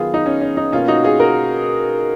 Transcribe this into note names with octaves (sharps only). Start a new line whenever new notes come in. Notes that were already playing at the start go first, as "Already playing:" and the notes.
Already playing: D#3 F#3 B3 F4 G#4
D#4
C#4
C#4
D#4
B2 A#3 C#4 F4
D#4 F#4
F4 G#4
F#4 A#4